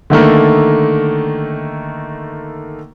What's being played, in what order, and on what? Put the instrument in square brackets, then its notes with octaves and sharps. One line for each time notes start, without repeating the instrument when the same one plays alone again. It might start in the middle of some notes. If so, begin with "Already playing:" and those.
[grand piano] D3 D#3 A3 A#3